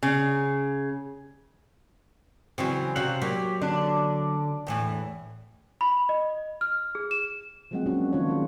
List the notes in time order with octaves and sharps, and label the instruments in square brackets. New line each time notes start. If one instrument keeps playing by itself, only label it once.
[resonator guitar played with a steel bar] C#3
[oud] C#3 E3 F#3 [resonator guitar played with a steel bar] C4
[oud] C3 C#4 F#4 [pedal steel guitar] F5 F#5
[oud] F#3 A#3 [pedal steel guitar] G4
[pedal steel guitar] D3 [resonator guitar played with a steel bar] D4
[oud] E2 A2 E3
[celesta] B5
D#5
F6
G#4
E7
[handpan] F3 F#3 G#3 A#3 C4 F#5
F#3 G#3 A#3 C#4 D4 F#4
D#3 F3 A#3 D4 F4 C#5
D#3 G#3